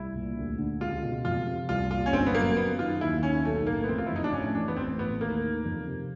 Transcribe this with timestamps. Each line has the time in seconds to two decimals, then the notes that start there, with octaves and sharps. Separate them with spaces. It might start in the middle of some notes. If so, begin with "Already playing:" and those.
Already playing: C2 E4
0.15 A#2
0.37 D2
0.58 D3
0.80 C#2 F4
1.02 B2
1.25 F2 F4
1.46 C3
1.69 C2 F4
1.91 A#2 F4
2.06 C#4
2.12 G1 C4
2.26 B3
2.35 F#2 A#3
2.57 F#2 B3
2.79 D#3 F4
3.01 D#2 E4
3.22 D#3 C#4
3.45 B1 A3
3.67 A2 A#3
3.84 B3
3.89 F1 C4
3.98 F4
4.07 E4
4.11 F2
4.16 D#4
4.24 D4
4.32 A2 C#4
4.55 E3 D4
4.68 B3
4.77 A1 C4
4.99 A2 B3
5.21 D#2 A#3
5.43 D#3
5.65 F2
5.86 C3